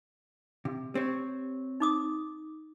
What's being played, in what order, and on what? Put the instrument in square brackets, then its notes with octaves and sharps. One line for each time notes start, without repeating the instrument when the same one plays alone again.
[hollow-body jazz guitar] C3
[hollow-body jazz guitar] C4 C#5 [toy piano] G4
[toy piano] D#4 D6 D#6